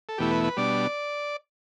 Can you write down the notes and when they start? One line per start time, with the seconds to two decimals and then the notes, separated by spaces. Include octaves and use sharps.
0.09 A4
0.18 E2 B2 A3 E4 G4
0.31 B4
0.44 B4
0.57 B2 G3 D4 D5